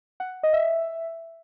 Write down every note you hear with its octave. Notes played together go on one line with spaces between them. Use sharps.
F#5
D#5
E5